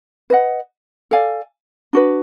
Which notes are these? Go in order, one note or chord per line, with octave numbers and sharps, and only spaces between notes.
B4 D#5 F#5
A4 D5 F5 G#5
D4 F#4 B4